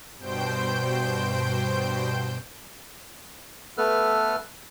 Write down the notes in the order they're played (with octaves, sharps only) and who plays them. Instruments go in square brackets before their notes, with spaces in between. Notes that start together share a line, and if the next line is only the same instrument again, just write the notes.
[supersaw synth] G2 B2 C5 G5 G6 D7
[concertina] A3 B3 A4 B4 F6